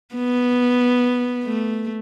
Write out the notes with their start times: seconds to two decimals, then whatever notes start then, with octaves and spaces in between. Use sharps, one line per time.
0.15 B3
1.44 A3